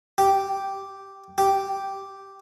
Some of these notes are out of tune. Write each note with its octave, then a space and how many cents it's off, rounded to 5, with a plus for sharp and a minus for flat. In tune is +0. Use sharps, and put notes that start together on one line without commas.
G4 -5
G4 -5